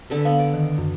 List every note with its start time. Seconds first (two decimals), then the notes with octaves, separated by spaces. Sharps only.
0.10 D3 A4 B4
0.25 B3 F5
0.39 D5
0.54 D#3
0.78 F#2